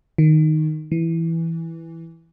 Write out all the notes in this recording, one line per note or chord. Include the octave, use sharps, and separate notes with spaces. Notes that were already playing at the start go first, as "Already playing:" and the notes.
D#3
E3